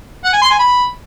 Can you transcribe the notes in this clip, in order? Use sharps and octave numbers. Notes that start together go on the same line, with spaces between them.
F#5
G#5
C6
G#5
B5